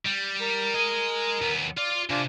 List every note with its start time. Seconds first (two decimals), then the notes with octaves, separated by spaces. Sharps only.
0.05 G3
0.41 A#4
0.74 G#4 D#5
1.42 D#2 B3
1.78 F4 D5
2.10 C3 D4 F4 G#5